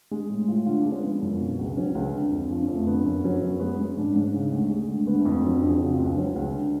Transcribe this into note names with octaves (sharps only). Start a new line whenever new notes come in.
G#3
A2
A2 F4
D3 F4
D4
G#3
C#4
F3 B3
F#2
B2
C#2
F#3 C#4
C#2
D3
F2
F3 D4
C#4
F2
A3
D3 B3
F#2
F#3 C#4
F#2 B3
G#3 B3
G#3 C#4
G#2 D4
G#2 C#4
C#3
D2
G#3
D2
D3 B3
A3
F2
B3
F#3 C#4
D4
F2
G#4
C#3 F#4
F4
C#2
D4
F#3 C#4
C#2
D3